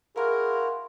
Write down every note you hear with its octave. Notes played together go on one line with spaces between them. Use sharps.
E4 F#4 G#4 A#4 F5 C6